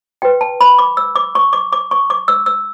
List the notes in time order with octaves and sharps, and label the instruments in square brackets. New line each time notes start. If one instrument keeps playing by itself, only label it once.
[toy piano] F#4 B4 G5
A5
B5
D6
E6
D6
C#6
D6
D6
C#6
D6
E6
E6